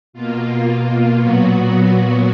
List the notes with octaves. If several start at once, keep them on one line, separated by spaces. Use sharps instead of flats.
B2 A#3 F4
A#2 F#3 B3 F#4
F#4